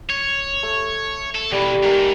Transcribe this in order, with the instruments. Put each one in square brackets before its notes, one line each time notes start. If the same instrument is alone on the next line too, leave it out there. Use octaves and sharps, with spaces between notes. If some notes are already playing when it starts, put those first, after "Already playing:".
[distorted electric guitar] C#5
[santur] A3
[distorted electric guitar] A4
[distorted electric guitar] B2 E3 [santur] G3
[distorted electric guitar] G#2 [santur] G4 A#4 E5